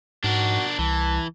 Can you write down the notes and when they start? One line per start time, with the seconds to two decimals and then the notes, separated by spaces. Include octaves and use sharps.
0.24 G#2 D4 F#4 A#4
0.79 C2 E3 A5